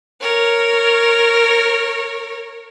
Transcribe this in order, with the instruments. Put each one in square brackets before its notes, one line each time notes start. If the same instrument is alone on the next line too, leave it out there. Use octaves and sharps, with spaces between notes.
[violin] A#4 C#5